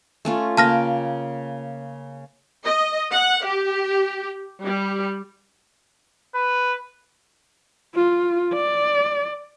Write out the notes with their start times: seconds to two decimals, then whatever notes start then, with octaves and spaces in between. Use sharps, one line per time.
0.25 A3 C#4 F4
0.57 C#3 A#3 G5 A5 F6 A#6
2.64 D#5
3.12 F#5
3.44 G4
4.63 G3
6.35 B4
7.94 F4
8.54 D5